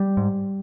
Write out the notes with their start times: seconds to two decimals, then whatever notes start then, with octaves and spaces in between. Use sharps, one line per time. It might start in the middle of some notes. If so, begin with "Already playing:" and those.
Already playing: G3
0.17 G#2